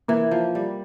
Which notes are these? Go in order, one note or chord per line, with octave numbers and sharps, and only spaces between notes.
E3 A#3
F3
G3